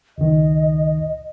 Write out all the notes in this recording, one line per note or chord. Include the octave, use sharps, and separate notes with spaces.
C#2 D#3 D#5